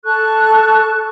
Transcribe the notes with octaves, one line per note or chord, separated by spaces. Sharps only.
A4 A5 C#6 F#6